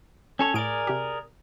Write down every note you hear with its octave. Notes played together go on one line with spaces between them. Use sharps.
C#4 A4 C#5
A2 G#4 A#4 D5 D7
C3 G4